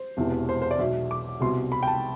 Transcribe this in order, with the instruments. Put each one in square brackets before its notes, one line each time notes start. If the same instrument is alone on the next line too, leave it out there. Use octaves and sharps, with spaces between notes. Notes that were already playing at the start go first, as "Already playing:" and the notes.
Already playing: [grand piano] C5
E1 E2 C3 E3
C5
C5
D5
B1 B2 E5
D6
C2 B2 C6
B5
G5
A5